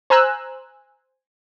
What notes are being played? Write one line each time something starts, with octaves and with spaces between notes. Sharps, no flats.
C5 G#5 A#5 E6 F#6